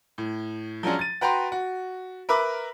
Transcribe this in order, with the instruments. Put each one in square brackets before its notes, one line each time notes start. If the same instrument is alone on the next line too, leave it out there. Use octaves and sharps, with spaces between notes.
[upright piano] A2
F3 F#3 G#3 C#4 D4
A6 D#7
F#4 B4 G5 A#5 C6
F#4
A#4 B4 E5 B5 D6